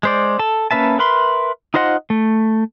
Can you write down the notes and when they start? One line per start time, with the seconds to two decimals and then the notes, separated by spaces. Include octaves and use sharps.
0.03 G#3 C5 D5
0.39 A4 A5
0.71 A#3 C#4 B4 E5 A5
0.99 A#4 B4 E5 B5 C6
1.74 D#4 F4 C5 D#5 F#5
2.10 A3